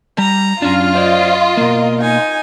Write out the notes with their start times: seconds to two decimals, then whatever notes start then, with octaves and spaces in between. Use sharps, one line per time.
0.18 G3 A#5
0.62 F#2 C#4 D4 F4 F6
0.95 C5 D5 D#5
1.57 B2 A#3 A#4
2.01 D#4 G#5